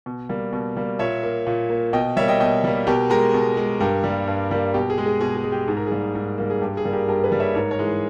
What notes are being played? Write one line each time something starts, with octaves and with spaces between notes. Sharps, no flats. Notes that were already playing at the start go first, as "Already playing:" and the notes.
B2
G3 A#3
B2
G3 A#3
A#2 C#5 E5
A#3
A#2
A#3
B2 D#5 G5
G3 A#3 C#5 E5
D#5 G5
B2 D#5 G5
G3 A#3
B2 G4 A#4
G#3 G4 A#4
B2
G#3
G2 G4 A#4
G3 A#3
G2
G3 A#3
B2 G4
G#4
G#3
G#4
B2 G#4
G#4
G#3
G4
G#2 G#4
A#4
G3 A#3 G#4
G#2
G3 A#3
G#4
G2 G4
G#4
G3 A#3
G4 A#4
G2 G4 A#4
G#4 B4
G3 A#3
C#5 E5
G#2 A#4 C#5
A#4 C#5
E3 G#3
G#4